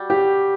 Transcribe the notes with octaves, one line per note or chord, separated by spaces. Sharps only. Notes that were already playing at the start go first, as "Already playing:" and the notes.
Already playing: G3 F#4
G4